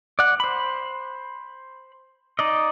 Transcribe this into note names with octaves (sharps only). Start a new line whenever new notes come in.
D5 F#5
C5 B5
D#4 D5 D#5